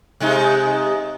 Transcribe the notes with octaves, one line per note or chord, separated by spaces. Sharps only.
C3 G#3 D#4